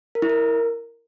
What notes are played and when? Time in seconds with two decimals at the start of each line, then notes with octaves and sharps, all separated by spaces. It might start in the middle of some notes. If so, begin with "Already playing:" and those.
0.15 A#4
0.22 E4
0.29 A#4